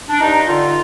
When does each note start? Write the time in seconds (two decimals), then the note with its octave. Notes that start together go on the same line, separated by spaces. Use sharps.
0.10 D4
0.20 G2 D#4
0.48 D3 F4